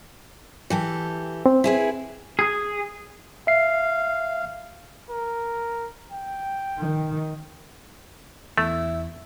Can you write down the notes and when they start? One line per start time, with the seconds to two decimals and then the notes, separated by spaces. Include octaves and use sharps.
0.70 E3 G4 A4
1.46 C4
1.64 E4 G#4 B4
2.39 G#4
3.47 E5 F5 C7
5.10 A#4
6.12 G5
6.79 D#3
8.58 E2 A3 E4